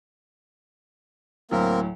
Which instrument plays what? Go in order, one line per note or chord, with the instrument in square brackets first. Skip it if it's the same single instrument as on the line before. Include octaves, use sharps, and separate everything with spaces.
[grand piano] D2 A2 F#3 [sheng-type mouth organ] A#3 C4 A#4